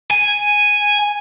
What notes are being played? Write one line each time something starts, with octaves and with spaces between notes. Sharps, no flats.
G#5